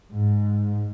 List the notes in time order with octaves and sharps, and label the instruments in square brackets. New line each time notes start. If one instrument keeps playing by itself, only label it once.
[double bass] G#2